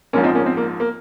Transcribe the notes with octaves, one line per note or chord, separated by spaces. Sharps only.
A#1 G#2 F3 A#3 C#4
C4 D#4
A#3 C#4
C4
A#3
A#3